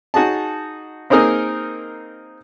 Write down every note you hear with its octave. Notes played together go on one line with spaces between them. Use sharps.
D#4 F#4 G#4 A5
A#3 C4 D#4 G#4 A#4